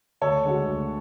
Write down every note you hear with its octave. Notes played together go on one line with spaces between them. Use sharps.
D2 A4 C#5
D3 G#3 D4 F#4
D2